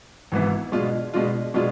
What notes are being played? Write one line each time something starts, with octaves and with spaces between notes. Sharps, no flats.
G#1 G#2 E3 B3 E4
B2 G#3 D4 F4
B2 G#3 D4 F4
B2 G#3 D4 F4